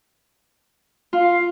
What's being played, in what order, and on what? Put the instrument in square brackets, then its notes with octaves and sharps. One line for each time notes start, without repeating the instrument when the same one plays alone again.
[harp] F4 [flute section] F5